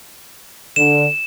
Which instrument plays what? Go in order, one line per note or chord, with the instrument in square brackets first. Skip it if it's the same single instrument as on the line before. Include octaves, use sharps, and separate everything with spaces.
[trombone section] D3 [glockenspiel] E7